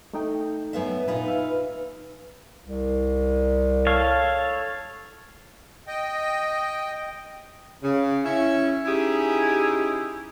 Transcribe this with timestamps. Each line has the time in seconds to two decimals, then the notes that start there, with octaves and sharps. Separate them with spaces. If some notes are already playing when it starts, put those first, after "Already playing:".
0.13 A3 D#4 G5
0.73 F#2 B3 E5
1.08 A#2 D#4 F4 B4 G#5 B5
1.28 E5 F5
2.63 C2
3.87 A4 C#5 F5
5.87 D#5 G5
7.83 C#3
8.25 C#4 E4 E5
8.85 C#4 D#4 E4 G4 G#4